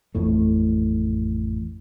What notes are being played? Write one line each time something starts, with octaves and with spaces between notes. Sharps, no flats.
A1 F2 A2 A3